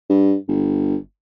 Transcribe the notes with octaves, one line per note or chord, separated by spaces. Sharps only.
G2
G1